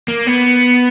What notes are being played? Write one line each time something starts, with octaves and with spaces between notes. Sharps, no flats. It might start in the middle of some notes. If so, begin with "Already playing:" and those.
A#3
B3